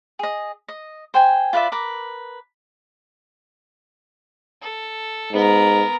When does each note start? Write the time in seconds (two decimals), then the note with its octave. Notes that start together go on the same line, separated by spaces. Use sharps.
0.19 G#4 D#5
0.68 D#5
1.14 C5 G5 G#5
1.53 F4 B4 D5 E5
1.72 A#4 B4 D6
4.62 A4
5.33 G#2 B3 A#4